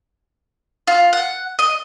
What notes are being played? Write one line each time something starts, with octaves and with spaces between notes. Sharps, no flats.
F4
F#5
D#5